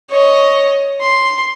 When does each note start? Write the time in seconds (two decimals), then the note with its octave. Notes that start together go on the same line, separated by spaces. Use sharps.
0.10 C#5 D#5
1.01 C6